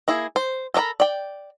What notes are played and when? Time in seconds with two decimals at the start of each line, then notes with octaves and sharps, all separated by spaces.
0.08 A#3 E4 G#4
0.36 C5
0.74 A4 A#4 D5 A#5 B5
1.00 D5 G5